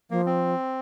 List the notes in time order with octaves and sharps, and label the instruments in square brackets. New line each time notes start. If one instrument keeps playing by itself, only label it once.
[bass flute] F3 [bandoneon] A#3
[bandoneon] C4